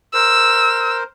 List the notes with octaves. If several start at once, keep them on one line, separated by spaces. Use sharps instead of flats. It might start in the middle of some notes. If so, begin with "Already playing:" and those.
A#4 C5 E6